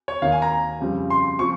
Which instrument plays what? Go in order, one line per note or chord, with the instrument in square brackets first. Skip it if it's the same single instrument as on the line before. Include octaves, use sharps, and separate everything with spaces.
[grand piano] C#5
D#2 D#3 A#3 F5
G#5
A#5
F2 C#3 G3
C6
F3 C4 C#6